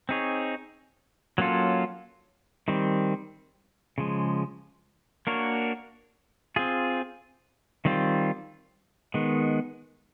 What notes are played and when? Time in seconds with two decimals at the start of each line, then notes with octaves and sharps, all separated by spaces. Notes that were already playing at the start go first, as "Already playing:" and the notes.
0.09 C4 D#4 G#4 C#5
1.38 F#3 A#3 C#4 F4 A4
2.68 D#3 G3 C4
3.98 C#3 F3 G#3
5.27 A#3 D4 F#4 A#4 C#5
6.56 C4 F4 G#4
7.85 D#3 G3 C4 F4
9.14 D#3 G#3 B3